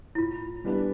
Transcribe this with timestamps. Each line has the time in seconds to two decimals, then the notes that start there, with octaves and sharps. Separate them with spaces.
0.15 E4
0.18 A2 F4
0.64 E3 G3 B3 D4